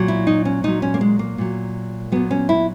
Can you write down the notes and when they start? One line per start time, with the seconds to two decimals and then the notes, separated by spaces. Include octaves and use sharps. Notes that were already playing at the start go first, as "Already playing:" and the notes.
Already playing: A#2 F#3
0.08 E4
0.27 D#4
0.45 C#4
0.64 A#2 F#3 D#4
0.82 C#4
0.94 A#3
1.01 G#3
1.19 A#3
1.38 A#2 F#3
2.12 A#2 F#3 B3
2.31 C#4
2.49 E4